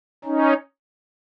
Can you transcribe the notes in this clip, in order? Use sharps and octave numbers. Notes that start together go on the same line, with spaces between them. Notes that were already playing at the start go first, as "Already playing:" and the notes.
C#4 D#4